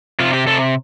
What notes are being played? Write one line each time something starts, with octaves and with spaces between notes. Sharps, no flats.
C3 F4
G4
C3 A4